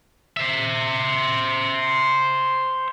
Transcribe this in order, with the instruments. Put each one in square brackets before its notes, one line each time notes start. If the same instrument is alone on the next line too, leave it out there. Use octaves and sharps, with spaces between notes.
[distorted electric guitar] C5 E5